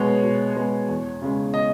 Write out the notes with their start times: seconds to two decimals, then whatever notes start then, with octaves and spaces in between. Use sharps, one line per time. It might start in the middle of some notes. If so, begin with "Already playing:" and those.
Already playing: B2 G#3 B3 C#5
0.23 B2
0.56 G#3 B3
0.89 E2
1.22 C#3 G#3
1.54 D#5